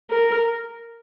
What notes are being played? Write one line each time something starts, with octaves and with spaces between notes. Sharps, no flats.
A#4